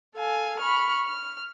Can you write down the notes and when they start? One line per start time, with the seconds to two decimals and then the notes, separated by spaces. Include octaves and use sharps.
0.16 A4 F5 G#5
0.60 B5 C#6 F6
1.05 F6